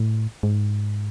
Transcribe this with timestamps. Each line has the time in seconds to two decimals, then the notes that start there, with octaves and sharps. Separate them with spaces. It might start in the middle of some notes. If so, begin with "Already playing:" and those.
Already playing: A2
0.43 G#2